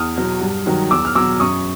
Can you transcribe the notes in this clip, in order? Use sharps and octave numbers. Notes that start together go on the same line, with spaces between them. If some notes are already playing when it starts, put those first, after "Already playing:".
Already playing: E2 D#6 F6
B2 F#3
G2
D#3 F#3
E2 D6 E6
F6
B2 F#3 D6 E6
F#2 C#6 D#6